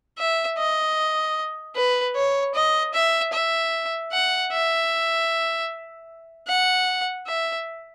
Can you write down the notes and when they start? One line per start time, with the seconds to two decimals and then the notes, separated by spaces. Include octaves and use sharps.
0.18 E5
0.57 D#5
1.75 B4
2.15 C#5
2.55 D#5
2.94 E5
3.33 E5
4.12 F#5
4.52 E5
6.48 F#5
7.27 E5